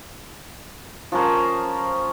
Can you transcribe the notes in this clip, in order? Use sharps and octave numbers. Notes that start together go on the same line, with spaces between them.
F3 C#4 A#4 C5